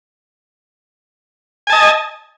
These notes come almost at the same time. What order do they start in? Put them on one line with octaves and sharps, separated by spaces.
G#5 A5 D#5